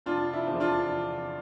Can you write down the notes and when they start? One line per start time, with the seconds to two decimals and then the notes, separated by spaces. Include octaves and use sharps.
0.06 F1 D4 F4
0.33 E4
0.47 E2 D3 F3
0.60 D4 F4
0.88 F1